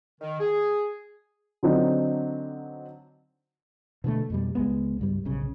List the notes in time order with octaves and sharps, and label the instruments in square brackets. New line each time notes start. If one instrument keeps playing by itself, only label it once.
[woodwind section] D#3
G#4
[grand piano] D3 F#3 C4 D4 D#4
[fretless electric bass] B2 D3 E3 A3
F2 B2 G3
C#2 G#3 B3
C#2 G2 G3
D1 B1 C#3